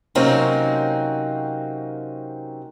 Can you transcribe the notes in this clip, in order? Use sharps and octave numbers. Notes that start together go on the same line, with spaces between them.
C3 F#3 A#3 C4 C#4 D#4